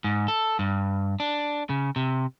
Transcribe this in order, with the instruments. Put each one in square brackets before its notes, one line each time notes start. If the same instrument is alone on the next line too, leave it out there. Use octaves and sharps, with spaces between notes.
[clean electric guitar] G#2
A4
G2
D4
C#3
C3